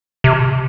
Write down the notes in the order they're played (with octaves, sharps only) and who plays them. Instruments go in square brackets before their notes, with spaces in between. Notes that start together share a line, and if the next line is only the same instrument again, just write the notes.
[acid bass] C3